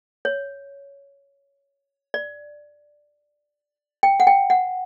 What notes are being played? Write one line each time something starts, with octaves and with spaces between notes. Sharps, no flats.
C#5
D5
G5
F#5
G5
F#5